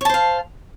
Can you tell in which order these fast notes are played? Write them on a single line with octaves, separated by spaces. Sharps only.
C#5 A5 C5 F5